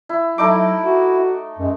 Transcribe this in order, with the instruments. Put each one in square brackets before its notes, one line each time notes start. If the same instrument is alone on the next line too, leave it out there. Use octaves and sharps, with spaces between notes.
[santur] E4
[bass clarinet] F#3 [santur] A3 D#4 D6 [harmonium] E4
[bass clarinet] F#4
[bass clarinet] F#2 [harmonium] G#3